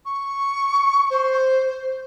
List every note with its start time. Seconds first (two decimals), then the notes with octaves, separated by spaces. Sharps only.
0.06 C#6
1.10 C5